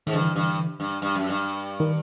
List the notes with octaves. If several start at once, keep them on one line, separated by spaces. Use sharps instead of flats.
G#2 D#3
G2 D3 E3
G2
G2
G2
F#2
G2
D#3